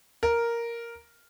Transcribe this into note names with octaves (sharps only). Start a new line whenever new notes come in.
A#4